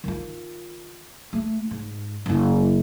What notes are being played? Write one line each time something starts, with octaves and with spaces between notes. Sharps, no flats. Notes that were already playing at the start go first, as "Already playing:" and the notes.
D#3 F4
A3
G#2
F#1 E4